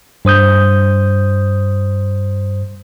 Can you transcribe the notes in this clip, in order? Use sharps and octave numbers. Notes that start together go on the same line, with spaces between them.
G2 C5 D#6 G6